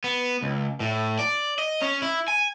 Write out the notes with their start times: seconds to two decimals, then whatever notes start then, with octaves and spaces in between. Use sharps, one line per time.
0.04 B3
0.43 C#2
0.80 A2
1.19 D5
1.58 D#5
1.82 C#4
2.02 E4
2.28 G#5